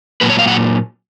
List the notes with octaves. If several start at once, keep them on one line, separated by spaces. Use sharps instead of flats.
A#2 F#3 A#3 B4
C#5
F5
F#5